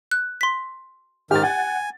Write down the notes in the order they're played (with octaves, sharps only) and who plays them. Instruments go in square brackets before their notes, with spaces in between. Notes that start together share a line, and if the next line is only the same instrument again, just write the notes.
[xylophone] F#6
C6 B6
[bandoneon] G#2 D#3 F6 [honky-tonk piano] G4 A6
[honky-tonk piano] F#5 [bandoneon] G#5